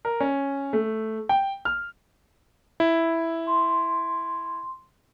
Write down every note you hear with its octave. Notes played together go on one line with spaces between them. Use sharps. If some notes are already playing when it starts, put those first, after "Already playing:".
A#4
C#4
A3
G5
F6
E4
C6